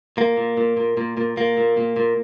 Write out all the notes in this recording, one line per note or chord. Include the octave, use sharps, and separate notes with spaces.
A#2 A#3
A#2
A#2
A#2
A#2
A#2
A#2 A#3
A#2
A#2
A#2